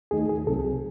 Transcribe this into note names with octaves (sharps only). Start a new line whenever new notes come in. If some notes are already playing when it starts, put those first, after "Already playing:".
D#2 D#3 A3 D#4 G#4
G#4
C2 C3 F#3 C4 A4
G#4